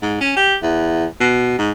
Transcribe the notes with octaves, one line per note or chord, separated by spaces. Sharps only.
G#2
C#4
G4
E2
B2
G#2